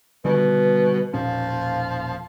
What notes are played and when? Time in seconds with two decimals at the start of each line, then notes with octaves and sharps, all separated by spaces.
0.25 B2 D3 D#3 G3 B4
1.14 E1 A#2 F3 C#4 F5